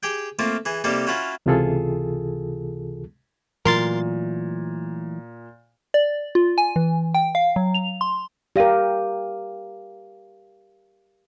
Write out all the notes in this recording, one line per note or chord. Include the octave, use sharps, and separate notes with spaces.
G4 G#4 G5
A3 A#3 C4 F4
E3 G#4
C3 G3 A#3 D#4 A4
F#3 C#4 E4 F4
C#2 C3 E3 F4 G#4 A4
A#2 E3 F#3 A3 A#4 C6 A6
D5
F4
G#5
E3
G5
F5
F#3
F7
C6
G4 A#4 D5 F5 D#7